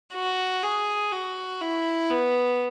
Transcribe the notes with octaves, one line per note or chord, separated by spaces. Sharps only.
F#4
G#4
F#4
E4
B3